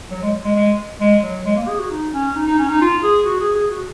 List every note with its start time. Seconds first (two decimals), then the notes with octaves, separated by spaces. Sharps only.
0.11 F#3
0.23 G#3
0.44 G#3
0.56 G#3
1.01 G#3
1.23 F#3
1.46 G#3
1.57 A#3
1.68 G#4
1.79 F#4
1.91 D#4
2.14 C#4
2.36 D#4
2.47 D#4
2.59 C#4
2.70 D#4
2.81 F4
3.03 G#4
3.25 F#4
3.41 G#4
3.56 G#4
3.71 F#4